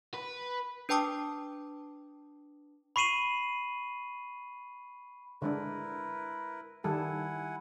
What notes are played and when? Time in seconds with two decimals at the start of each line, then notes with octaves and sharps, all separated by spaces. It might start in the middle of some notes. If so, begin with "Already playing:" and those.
0.14 B4
0.89 D4 B4 G5 A5 D6 D#6
2.96 B5 C#6 C7 D#7 E7 F#7
5.42 D3 G#3 D4 E4 A#4 B4
6.84 D#3 G3 E4 A4 F#5 G#5